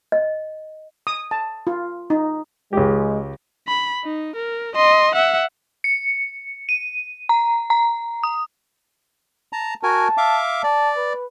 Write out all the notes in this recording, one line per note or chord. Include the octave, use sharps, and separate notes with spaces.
D#5
D#6
A5
F4
D#4
C#2 G#3 G4
B5
D#4
A#4
D#5 C6
E5 F#5
C#7
D#7
A#5
A#5
D#6
A5 A#5
F#4 A#4 G#5 A5
E5 F5 D6
D5 A5
B4